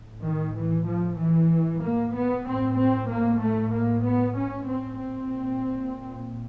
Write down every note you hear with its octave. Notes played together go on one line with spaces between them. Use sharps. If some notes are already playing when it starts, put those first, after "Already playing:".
Already playing: A2
D#3
E3
F3
E3
A#3
B3
A2 C4
C4
A#3
A3
A#3
B3
C#4
C4
A#2 C4